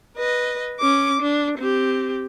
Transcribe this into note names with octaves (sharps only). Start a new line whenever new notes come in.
B4 D#5
C#4 D6
D4
C4 G4